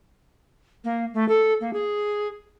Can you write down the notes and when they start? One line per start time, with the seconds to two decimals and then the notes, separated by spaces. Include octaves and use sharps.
0.84 A#3
1.13 A3
1.28 A4
1.60 A#3
1.73 G#4